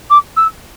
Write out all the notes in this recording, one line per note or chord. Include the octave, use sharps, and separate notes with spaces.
D6
E6